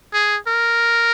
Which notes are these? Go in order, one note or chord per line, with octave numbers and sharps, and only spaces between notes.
G#4
A#4